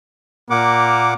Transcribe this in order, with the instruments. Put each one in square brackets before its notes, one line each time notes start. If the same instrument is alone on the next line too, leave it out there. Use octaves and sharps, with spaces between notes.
[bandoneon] A#2 F#5 D6 [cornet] A#3